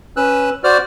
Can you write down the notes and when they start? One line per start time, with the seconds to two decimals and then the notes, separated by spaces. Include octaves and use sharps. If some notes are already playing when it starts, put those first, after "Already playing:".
0.17 C#4 B4 E6 F#6
0.64 F#4 C5 D5 F6